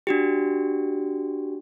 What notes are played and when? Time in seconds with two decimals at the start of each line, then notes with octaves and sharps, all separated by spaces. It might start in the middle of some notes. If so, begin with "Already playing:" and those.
0.07 D4 F#4 G4